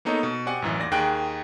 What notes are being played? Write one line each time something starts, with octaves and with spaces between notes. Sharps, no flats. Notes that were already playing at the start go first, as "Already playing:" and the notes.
A#3 B3 D#4 A4 C#5 D#5
B2
C4 G4 D5 F#5 G#5
A1 F#2 E3
D#2 D5 A#6
D#2 D#3 G#4 G5 F#6 D7